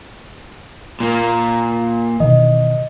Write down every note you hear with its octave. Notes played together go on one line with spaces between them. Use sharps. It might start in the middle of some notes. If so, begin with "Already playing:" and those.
A#2 A#3
B2 D#3 E3 D#5